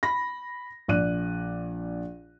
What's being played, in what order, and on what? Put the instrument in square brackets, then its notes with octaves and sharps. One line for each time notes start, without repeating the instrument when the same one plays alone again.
[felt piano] B5 A#6
A#1 D5 F#6 D#7